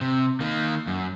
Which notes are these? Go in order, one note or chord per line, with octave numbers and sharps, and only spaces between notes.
C3
D#3 A#3
F#2